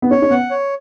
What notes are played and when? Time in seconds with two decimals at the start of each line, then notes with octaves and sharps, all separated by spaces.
0.02 B3
0.11 C#4 C#5
0.22 C#4
0.30 B3 F#5
0.51 C#5